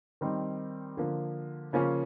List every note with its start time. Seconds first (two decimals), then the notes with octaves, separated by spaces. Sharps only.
0.21 D#3 G3 C4 D#4
0.97 D3 F3 A#3
1.73 C#3 F3 A#3 C#4